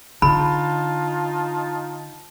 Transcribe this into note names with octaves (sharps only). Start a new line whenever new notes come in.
D3 D#4 F4 A5 B5